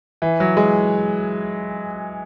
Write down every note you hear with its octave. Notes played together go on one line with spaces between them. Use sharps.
E3
F#3
G#3